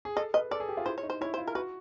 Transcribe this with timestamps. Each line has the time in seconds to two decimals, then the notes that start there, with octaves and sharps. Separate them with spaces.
0.05 G#4
0.16 A4 D#5
0.34 B4 D#5
0.51 A4 D5
0.60 G#4
0.69 G4
0.77 F4
0.86 E4 C5
0.98 C#5
1.03 D#4
1.10 C5
1.21 E4 C#5
1.34 C5
1.38 F4
1.48 A#4
1.55 F#4 B4